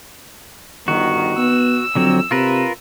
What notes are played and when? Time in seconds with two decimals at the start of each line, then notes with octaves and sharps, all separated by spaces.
0.88 G1 D#3 F#4
1.37 B3 E6
1.95 F2 D3 F#3 C4
2.31 C3 F4 A#4 B4